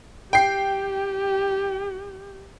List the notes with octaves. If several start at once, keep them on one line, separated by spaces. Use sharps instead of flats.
G4 G5 C7